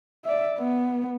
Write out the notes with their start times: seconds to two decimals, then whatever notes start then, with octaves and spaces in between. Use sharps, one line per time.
0.25 D5 E5
0.58 B3